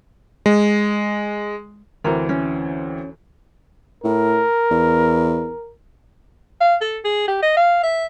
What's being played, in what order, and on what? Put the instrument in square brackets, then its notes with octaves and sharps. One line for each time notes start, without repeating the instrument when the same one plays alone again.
[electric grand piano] G#3
[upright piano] D2 E3 C4 [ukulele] A#4
[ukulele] C#4
[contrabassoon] A2 [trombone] A#4
[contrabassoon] E2
[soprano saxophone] F5
A4
G#4
G4
D#5
F5
E5